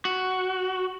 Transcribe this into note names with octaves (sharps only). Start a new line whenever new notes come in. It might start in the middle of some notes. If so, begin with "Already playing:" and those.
F#4